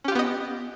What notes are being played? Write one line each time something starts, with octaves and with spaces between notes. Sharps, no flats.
B3 C#4 F4 G4 D#5